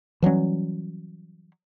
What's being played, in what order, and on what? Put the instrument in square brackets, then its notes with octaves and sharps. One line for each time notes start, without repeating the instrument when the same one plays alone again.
[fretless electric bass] E3 F#3 G3 C#4